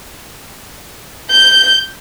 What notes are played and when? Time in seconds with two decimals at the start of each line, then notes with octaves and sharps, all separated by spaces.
1.31 G6